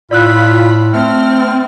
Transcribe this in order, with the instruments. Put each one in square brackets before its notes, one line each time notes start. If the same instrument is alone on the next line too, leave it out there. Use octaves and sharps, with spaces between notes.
[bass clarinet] A2 [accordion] F4 B5 [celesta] D5 E6 F#6
[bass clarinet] A3 [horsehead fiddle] C4 [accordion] F6